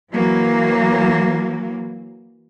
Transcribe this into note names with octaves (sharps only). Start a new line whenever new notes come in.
E3 F#3 A#3